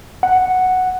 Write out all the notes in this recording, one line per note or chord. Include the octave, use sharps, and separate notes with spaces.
F#5